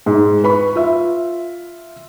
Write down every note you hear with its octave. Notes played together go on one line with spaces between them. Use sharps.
G#2
B4 B5 C#6
F4 E5